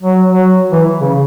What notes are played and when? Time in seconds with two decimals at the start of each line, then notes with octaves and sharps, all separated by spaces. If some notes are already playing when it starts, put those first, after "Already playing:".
0.02 F#3
0.29 F#3
0.72 E3
1.01 C#3